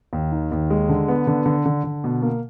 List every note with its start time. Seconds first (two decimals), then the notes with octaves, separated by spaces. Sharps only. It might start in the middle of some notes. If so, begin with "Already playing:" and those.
0.13 D#2
0.32 D#3
0.52 D#2
0.70 G#3
0.89 D3
1.08 B3
1.27 D3
1.46 D3
1.66 D3
1.84 D3
2.04 B2
2.22 A#3